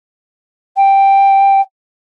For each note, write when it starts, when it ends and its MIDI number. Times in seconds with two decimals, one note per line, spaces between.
0.77 1.61 79